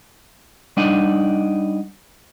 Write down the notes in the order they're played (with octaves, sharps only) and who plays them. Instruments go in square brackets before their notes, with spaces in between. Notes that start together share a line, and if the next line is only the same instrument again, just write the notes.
[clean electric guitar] G3 D4 D#4 D5 D#5 F#5